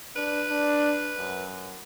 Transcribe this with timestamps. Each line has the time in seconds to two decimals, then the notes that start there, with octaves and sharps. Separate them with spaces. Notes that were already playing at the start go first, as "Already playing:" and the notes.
0.16 D4 B4
0.49 D4
1.18 F#2